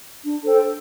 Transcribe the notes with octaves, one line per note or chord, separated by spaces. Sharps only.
D4
A4 C5 G5